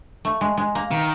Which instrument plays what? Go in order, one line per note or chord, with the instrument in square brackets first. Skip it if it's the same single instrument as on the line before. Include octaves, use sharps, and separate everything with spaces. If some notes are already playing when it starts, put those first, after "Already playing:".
[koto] A3
G#3
G#3
A#3
[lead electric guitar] D#3